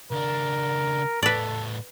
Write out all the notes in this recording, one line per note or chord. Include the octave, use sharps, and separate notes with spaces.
C#2 D4 A#4
A2 B3 A4 B4 D5